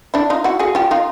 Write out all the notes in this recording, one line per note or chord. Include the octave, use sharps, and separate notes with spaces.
D4 E4
D#4 F4
E4 F#4
F#4 G#4
F4 G4
D#4 F4